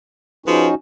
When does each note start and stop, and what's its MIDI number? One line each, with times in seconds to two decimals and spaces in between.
0.46 0.67 53
0.46 0.75 61
0.46 0.75 63
0.46 0.75 66
0.46 0.67 68
0.46 0.67 71